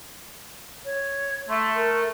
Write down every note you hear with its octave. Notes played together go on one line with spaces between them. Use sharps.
C#5
A3 C6
A#4